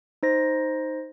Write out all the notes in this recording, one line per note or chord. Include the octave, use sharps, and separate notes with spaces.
D#4 C5 A#6